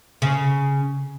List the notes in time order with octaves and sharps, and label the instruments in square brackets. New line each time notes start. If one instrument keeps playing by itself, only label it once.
[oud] C#3